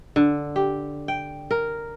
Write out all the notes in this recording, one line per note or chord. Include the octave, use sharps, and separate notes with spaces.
D3
G4
G5
A#4